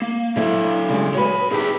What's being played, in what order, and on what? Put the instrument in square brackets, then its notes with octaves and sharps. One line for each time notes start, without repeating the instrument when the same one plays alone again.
[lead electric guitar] A#3
[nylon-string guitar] D3 C4 E4 [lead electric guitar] F#3 A4
[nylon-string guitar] C#3 G3 G#3
[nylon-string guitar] F#4 B4 [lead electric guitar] C#5 B5
[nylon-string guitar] D#4 G4 [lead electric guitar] G#4 B4